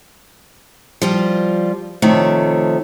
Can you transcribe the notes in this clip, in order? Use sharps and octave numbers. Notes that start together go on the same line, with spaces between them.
F3 G3 F4
C3 D#3 F3 A3 C#5